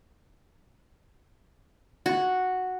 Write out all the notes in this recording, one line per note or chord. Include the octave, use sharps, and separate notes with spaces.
F#4